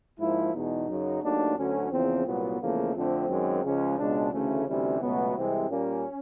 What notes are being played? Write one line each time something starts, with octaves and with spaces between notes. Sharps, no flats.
G#2 F3 A#3 E4
E2 B2 G#3 D#4
F#2 C#3 F#3
D#2 D#3 F#3 A3 D4
D2 D3 F#3 C#4
E2 C#3 F3 C4
C2 A#2 F#3 B3
E2 C#3 F3 A3 A#3
F2 D3 F3 A3 C4
F#2 D#3 G#3
C#2 C#3 F3 G#3 C#4
C#2 B2 G#3 D4
D2 C#3 E3 A3 C#4
D2 C3 E3 G3 C#4
C#2 B2 F#3 A3 B3
C2 C3 E3 G#3 C4
A#2 G3 A#3 C#4